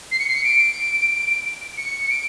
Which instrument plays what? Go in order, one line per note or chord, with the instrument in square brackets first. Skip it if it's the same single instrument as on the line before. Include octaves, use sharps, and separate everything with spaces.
[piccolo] C7
C#7
C7
C#7
D7
C#7
C#7
D7